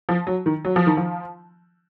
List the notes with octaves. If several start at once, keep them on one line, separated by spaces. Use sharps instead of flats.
F3
F#3
D#3
F#3
F3
D#3
F3